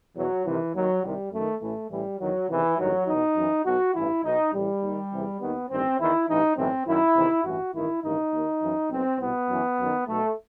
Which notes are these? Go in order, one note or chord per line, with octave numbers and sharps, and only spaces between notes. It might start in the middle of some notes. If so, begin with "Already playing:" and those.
E2 B2 F#3
C2 C3 D#3 E3
D#2 D#3 F#3
C2 C3 D#3 G3
F#2 D#3 A3
A1 A2 E3 A3
A1 A2 E3 G3
E2 D#3 F#3
E2 C3 D#3 E3
A1 G2 D#3 F#3
E2 B2 D#4
F#2 E3
B1 B2 F#4
A1 G2 E3 E4
B1 B2 D#4
A1 A2 E3 G3
D#2 D#3
E2 C3 E3
D#2 D#3 B3
A1 G2 D#3 C4
E2 D#3 E4
A1 G2 E3 D#4
B1 A2 E3 C4
F#2 D#3 E4
E2 C3 D#3
A1 G2 E3 F#4
A1 G2 D#3 E4
A1 G2 D#3 D#4
D#2 D#3
F#2 E3
B1 B2 C4
C2 B2 B3
F#2 E3
F#2 D#3
B1 B2 A3